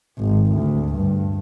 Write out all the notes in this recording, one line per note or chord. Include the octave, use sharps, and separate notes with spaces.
G#1
D2
G2